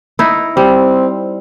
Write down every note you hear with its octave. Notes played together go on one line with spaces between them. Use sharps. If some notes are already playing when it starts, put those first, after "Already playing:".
D#4 E4
G3 C4